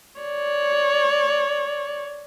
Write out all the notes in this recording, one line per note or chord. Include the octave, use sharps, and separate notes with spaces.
C#5 D5